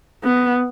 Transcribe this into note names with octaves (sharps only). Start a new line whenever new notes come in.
B3